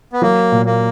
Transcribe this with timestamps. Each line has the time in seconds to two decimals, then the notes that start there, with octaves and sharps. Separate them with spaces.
0.13 B3
0.22 F#3 A#3
0.52 A#2
0.66 A#3